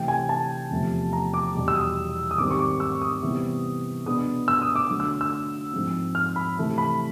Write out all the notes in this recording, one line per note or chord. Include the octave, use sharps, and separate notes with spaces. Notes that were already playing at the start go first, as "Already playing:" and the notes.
Already playing: C3 E3 A3 G5
G#5
A5
E2 C3 F3 A3
A#5
D6
E2 B2 G3
E6
D#6
D#6
G#2 D#3 G3 C4 D6
C#6
D6
E6
D#6
C3 E3 G3 B3
B2 G#3 B3 D4 D#6
E6
D#6
D6
D3 F#3 A3
E6
E6
G#2 F3 G#3 C4
F6
B5
C3 E3 A3
B5